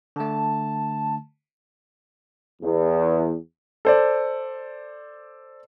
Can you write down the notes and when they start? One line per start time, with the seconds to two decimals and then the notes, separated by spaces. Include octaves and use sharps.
0.16 D3 A3 A5
2.62 E2
3.85 A4 C5 D5